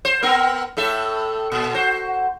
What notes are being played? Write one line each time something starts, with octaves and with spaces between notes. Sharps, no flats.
C5
B3 C4 A#4
A2 A4 E5
A#2
F#4 C5